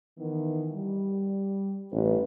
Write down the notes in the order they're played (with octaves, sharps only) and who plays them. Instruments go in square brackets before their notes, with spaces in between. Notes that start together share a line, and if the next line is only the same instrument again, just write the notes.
[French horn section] D#3 E3 B3
G3
[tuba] A1 [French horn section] G2 B4